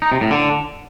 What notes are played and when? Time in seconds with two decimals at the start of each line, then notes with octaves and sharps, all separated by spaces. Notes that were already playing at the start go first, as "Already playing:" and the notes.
0.02 D#4
0.12 C3
0.21 A2
0.31 D3